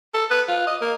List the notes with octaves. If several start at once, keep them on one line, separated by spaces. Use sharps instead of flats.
A4
B4
F4
D#5
A#3